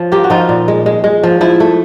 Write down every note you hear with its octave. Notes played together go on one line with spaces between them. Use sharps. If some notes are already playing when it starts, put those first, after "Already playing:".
Already playing: F3 C#5
A#3 F4 G4
F#4
F3 D#4 F4
A#2
G#3
G#3
G#3
F3
F3 E4
A3